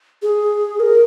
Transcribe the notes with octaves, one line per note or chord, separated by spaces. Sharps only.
G#4
A#4